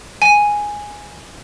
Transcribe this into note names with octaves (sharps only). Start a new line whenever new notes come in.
G#5